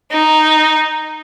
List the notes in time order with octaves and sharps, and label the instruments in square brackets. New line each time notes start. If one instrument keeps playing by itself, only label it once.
[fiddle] D#4